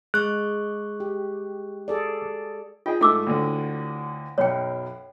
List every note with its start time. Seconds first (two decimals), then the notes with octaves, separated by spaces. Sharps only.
0.14 G#3 G#4 C#6 F#6
1.00 G4
1.88 G#4 A4 D5
2.86 F4 G#4 D#5 G5
3.01 G#2 A3 E4 D6 E6
3.27 D2 A2 D3
4.38 B1 F#2 B2 C#5 G5